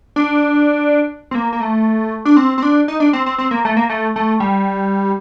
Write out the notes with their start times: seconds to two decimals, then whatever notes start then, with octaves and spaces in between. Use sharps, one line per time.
0.16 D4
1.31 C4
1.35 A#3
1.53 A#3
1.61 A3
2.25 D4
2.37 C4
2.58 C4
2.63 D4
2.88 D#4
3.00 D4
3.13 C4
3.26 C4
3.38 C4
3.51 A#3
3.65 A3
3.77 A#3
3.89 A3
4.16 A3
4.40 G3